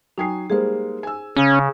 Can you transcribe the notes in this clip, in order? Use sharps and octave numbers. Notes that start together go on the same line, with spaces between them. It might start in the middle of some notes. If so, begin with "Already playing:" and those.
F#3 D#4 G5 G#5 D#6 C7
G3 G#3 A#3 G#4 C5
G#5 E6
C#3 C#4